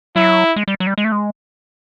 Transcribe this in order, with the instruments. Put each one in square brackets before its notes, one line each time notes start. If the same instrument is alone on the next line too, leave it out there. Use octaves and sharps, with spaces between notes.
[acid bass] F#3 [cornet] E4
[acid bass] G#3
G3
F#3
G3
G#3
A3
G#3